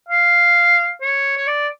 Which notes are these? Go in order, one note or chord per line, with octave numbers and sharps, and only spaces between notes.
F5
C#5
C#5
D5